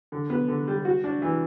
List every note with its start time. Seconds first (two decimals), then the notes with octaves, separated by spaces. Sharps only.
0.12 D3
0.30 B3
0.48 D3
0.68 G3
0.85 F#4
1.04 D4
1.22 E3